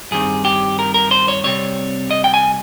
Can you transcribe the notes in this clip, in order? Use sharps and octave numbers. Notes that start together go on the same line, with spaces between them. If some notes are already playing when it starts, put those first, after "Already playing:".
G2 D#3 G3 C4 G#4
G4
A#4
A#4
C5
C#5
C3 G3 C4 C#5
D#5
G5
G#5